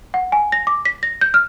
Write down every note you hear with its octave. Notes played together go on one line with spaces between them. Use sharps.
F#5
G#5
A#6
D6
B6
A#6
G6
F6